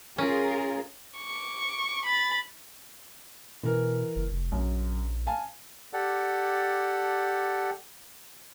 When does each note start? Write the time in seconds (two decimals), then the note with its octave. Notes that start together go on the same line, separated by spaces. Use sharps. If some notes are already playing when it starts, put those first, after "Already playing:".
0.18 C#4 F4 G#4 A#4
1.18 C#6 D6
2.06 B5 A6
3.63 B2 E3 A#4
4.16 F#1
4.30 F1
4.52 A#1 F#2
5.26 F5 G#5 A5
5.93 G4 A4 D5 F#5